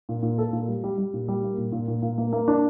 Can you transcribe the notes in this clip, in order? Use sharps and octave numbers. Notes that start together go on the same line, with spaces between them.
A#2
A#2
A4
A#2
G3
G3
G3
A#2
G3
A#3
A#2
A#2
A#2
A#2
A#3
A#3
D4